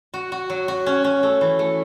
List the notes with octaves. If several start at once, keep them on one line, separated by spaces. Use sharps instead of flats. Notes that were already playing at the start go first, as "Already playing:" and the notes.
F#4
F#4
F#3
F#4
C#4
C#4
A3
E3
A3